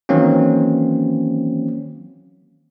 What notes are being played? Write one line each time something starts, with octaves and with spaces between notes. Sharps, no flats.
D#3 E3 F#3 A#3 C4 C#4